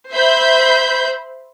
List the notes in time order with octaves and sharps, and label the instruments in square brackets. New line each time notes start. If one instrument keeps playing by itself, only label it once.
[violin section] C5 E5 B5 G6